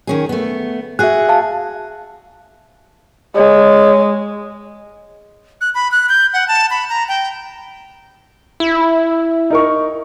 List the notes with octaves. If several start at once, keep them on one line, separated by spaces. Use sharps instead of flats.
D#3 C#4 G#4
A3 B3
F#4 G#4 E5 F#6
F5 A5
G#3 C#5
F#6
B5
F#6
G6
F#5
A5
B5
A#5
G5
E4
D#4 A#4 C#6